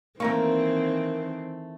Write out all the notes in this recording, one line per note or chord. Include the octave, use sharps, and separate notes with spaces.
D#3 E3 A3 A#3 C4 A#4 C#6